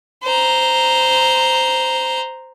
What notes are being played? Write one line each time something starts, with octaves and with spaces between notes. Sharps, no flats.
C5 A#5